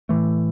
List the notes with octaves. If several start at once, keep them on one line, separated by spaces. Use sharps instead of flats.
A2 E3 A3